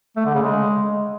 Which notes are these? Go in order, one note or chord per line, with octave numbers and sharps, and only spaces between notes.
A3
D3
C#3
G#3